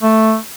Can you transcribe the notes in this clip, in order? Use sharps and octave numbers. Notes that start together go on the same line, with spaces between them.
A3